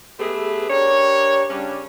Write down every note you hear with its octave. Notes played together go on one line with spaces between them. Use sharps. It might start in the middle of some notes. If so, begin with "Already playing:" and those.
A3 B3 G4 G#4 B4 E5
D4 G4 A#4 C#5
C#3 G3 C#4 D4